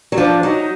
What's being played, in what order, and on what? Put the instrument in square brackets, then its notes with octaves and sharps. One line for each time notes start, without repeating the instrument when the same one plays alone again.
[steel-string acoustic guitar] F#3
[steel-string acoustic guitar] F3 [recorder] D4
[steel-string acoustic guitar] F#3 [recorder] D#4